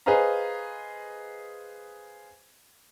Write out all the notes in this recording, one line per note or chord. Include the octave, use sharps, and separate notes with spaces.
G#4 B4 C5 D#5 F5 A#5